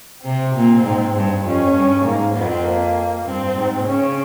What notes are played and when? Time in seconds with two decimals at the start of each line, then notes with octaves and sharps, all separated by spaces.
0.25 C3 C4
0.55 A#2
0.85 G#2
1.15 G2
1.44 F2 C#4
1.75 G2
2.04 G#2 A#3
2.35 F2 C4
2.65 A#3
3.25 G2 C4
3.55 G#2
3.85 C#3 C#4